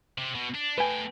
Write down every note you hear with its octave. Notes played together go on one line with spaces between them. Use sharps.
C3
B2
D4
A3 B4 G5 G#5